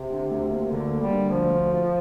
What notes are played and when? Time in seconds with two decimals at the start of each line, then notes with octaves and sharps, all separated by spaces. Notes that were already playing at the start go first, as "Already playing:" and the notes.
Already playing: C3
0.10 D3
0.31 D2
0.50 A#3
0.70 D2 D3
0.90 A#3
1.01 G3
1.10 D3
1.30 D2 F3
1.50 D2
1.70 F4